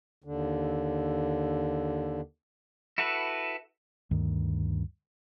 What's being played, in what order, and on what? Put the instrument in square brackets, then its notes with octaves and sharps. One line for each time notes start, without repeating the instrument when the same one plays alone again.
[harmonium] D#2 D3
[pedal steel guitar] E4 F#4 A4 B4
[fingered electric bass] D2 G2 D#3